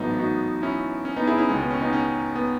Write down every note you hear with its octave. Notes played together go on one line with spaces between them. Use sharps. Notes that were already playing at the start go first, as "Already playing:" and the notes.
Already playing: A1 G#2 F#3 A3 B3 D#4
D#4 F#4
C#4 E4
C#4
B3 D#4
E4 G#4
C#4 E4
C#2 B2 G#3 C#4
B3
C#4
B3 D#4
C#4
B3